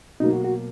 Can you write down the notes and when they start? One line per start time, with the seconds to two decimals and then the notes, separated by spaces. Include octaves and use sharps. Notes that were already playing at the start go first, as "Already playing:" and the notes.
0.20 B2 F#3 A#3 D#4
0.33 F#4
0.45 F#4